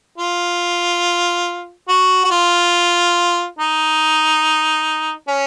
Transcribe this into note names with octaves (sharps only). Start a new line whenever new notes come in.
F4
F#4
F#4
F4
D#4
C#4